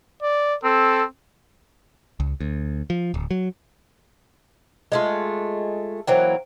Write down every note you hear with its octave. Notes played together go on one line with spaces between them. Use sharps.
D5
C4 A4
C#2
D2
F3
D1
F#3
G#3 A3 F4
E3 F#3 A#3 C5 G5